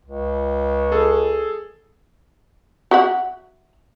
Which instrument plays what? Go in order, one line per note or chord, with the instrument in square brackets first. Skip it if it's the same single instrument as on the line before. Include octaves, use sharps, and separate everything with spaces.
[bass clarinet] C#2
[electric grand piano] G#4 A4
[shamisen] F#4 E5 F#5